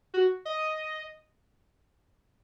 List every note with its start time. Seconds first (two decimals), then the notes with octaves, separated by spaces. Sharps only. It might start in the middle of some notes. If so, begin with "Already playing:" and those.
0.14 F#4
0.45 D#5